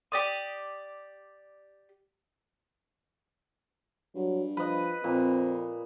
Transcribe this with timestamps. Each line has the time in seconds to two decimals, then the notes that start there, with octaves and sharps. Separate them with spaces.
0.12 G4 D5 D#6
4.15 G2 F#3
4.57 F3 B4 D#5
5.04 F2 A#2 C4